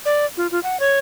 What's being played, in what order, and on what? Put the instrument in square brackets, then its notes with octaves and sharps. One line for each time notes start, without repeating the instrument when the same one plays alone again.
[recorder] D5
F4
F4
F#5
C#5